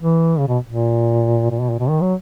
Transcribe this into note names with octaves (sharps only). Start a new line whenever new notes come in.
E3
C#3
B2
A#2
A#2
B2
A#2
B2
D#3
F#3